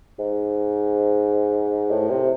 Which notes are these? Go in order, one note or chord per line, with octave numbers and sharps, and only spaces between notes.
G#2
A2
C3